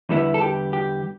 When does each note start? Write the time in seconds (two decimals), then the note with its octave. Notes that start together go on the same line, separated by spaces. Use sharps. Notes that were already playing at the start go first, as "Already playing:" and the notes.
0.09 E2 D3 G3 B3 E4
0.34 A4
0.41 G4
0.73 G4